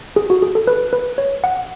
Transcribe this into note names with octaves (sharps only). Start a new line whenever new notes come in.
G#4
F#4
G#4
A4
B4
B4
C#5
F#5